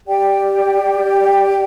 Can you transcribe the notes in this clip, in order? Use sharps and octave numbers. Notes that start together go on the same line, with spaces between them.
G4 D5 G5